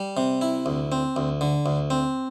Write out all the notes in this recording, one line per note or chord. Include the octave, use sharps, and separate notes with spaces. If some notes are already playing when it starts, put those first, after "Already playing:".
Already playing: G3
C3
E4
D2
C4
D2
D3
D2
C4